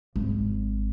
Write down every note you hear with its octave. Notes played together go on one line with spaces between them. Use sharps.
G#1